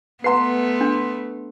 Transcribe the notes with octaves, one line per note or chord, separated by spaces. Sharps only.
A3 B3 B4 F#5 A#5 C6 C7
D4